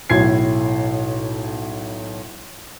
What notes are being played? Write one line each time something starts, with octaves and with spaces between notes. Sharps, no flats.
B1 A2 G#6 C7